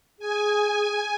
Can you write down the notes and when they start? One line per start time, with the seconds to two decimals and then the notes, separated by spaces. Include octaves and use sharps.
0.19 G#4 G#5